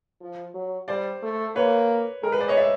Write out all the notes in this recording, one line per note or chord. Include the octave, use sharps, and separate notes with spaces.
F3
F#3
G3 C5 D5
A3
A#3 B4 C#5
G#3 A#4
B4
C5 D5
C#5 D#5
D5 E5